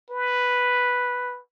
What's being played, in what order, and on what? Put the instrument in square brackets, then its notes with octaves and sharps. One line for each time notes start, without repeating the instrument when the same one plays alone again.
[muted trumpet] B4